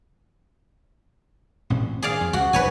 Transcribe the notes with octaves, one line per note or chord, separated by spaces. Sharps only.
A1 A#2 C4
D#3 G#4 D5 F5
F2
C#2 F#4
F1 B1 B4 C#5 G#5